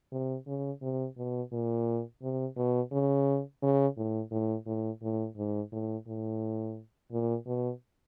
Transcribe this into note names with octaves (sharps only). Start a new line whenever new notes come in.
C3
C#3
C3
B2
A#2
C3
B2
C#3
C#3
A2
A2
A2
A2
G#2
A2
A2
A#2
B2